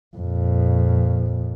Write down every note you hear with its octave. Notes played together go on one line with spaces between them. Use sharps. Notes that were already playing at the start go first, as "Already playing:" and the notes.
F2 A#2